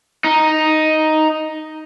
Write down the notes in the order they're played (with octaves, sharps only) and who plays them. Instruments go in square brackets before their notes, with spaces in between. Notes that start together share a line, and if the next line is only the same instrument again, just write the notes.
[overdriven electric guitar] D#4